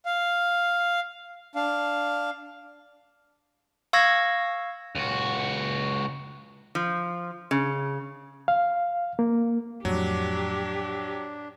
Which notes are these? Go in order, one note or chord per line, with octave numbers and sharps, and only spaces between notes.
F5
D4 F5
F5 C#6 E6 G#6 A#6
C#2 F#4
F3
C#3
F5
A#3
F2 A2 F#3 D4 G4